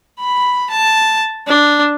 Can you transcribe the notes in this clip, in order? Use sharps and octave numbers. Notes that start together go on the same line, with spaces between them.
B5
A5
D4